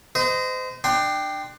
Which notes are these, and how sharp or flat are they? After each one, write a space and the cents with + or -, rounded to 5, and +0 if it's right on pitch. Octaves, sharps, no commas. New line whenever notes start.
C5 -35 D#5 +0
D4 +30 G5 +0 C6 -10